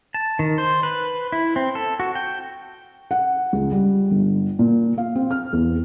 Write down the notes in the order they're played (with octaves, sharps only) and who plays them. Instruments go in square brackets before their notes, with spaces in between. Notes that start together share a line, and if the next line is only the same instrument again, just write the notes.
[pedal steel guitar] A5
D#3
C5
B4
E4
C4
A4
F#4
G5
[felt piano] F#5
C#2
G3
G1
A#2
F5
C4
F6
E2